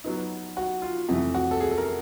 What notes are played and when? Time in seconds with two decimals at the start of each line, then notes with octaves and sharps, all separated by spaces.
0.04 F#3 B3 D#4
0.57 F#4
0.82 F4
1.08 F2 C3 E3 A3
1.34 F#4
1.51 A4
1.60 G#4
1.71 A4
1.78 A#4